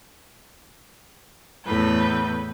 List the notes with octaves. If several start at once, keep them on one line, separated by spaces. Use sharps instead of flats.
E2 A2 A3 B4 G6